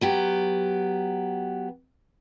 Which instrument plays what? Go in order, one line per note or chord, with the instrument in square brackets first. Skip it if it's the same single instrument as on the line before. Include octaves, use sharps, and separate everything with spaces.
[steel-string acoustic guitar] F#3 B3 G4